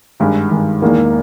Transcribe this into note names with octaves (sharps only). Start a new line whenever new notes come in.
G#1 G2 D#3 G#3
G#1 G2 D#3 G#3
E1 E2 D#3 G#3 A#3 D#4